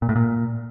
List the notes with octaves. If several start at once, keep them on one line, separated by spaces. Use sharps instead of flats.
A#2
A2
A#2